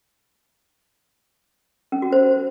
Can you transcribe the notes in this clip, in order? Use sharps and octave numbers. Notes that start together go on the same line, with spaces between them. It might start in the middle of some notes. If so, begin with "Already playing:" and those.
C#4
F#4
C5